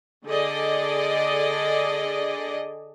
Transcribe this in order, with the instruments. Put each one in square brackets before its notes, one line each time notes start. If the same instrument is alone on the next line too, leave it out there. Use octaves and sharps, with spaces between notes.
[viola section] D3 G#4 A4 D5 D#5